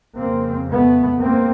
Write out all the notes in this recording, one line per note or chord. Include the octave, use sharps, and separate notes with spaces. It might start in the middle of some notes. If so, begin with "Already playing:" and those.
F2 C#3 A#3 C4
A3 B3
G#2 A#3 C4